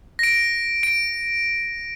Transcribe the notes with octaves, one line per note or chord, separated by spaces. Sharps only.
A#6 D7
D7